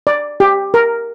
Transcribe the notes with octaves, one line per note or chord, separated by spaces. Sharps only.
D5
G4
A#4